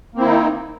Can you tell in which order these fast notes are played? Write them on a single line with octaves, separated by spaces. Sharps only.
A#3 C4 E4 D#3 D#4